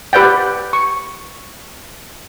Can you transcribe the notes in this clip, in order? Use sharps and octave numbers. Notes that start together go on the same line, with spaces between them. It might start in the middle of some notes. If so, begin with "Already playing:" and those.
G4 B4 D5 F#5 G5
C#6